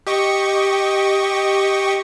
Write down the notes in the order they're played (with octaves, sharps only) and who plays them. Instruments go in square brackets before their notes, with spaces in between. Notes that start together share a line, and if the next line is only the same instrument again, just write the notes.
[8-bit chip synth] G4 D#5 C#6